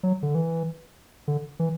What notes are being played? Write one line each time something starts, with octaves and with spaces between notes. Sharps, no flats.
F#3
D3
E3
D3
E3